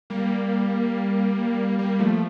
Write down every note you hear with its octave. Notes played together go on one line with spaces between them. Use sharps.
G3 A#3
G3 A#3
F3 A3